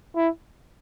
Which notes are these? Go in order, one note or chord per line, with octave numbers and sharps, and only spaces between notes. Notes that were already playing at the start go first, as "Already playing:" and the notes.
E4